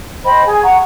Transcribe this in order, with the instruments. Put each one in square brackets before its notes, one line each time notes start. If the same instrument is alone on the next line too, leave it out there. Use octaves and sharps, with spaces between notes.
[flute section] C5 D#5 G5 B5
G#4 G#5
F#5 A#5 C#6